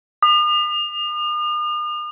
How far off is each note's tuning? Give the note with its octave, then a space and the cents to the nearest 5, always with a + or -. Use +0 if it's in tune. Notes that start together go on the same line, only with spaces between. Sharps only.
D#6 -45